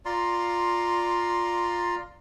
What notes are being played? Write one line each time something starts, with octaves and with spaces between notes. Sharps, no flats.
F4 D5 A#5 C6